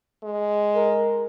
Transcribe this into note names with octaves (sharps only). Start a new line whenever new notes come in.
G#3
A#4